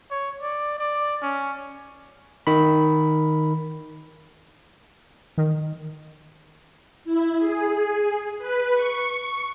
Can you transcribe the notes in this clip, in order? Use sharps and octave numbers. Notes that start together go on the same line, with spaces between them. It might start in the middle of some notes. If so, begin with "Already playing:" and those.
C#5
D5
D5
C#4
D#3 B5
D#3
E4
G#4
B4
C#6